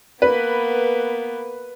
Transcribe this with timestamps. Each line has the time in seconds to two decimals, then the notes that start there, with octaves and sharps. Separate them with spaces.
0.22 A#3 B3 B4